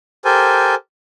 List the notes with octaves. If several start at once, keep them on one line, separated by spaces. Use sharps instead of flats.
G4 A4 A#4 C5 G#5